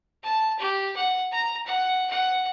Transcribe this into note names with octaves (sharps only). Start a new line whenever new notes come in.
A5
G4
F#5
A#5
F#5
F#5